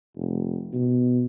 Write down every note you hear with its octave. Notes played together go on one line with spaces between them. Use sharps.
F1
B2